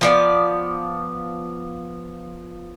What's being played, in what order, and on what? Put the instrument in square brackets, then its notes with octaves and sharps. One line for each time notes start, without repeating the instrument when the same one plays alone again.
[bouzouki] F3 B3 D5